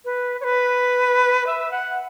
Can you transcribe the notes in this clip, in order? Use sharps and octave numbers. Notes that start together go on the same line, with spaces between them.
B4
C#5
B4
E5
F#5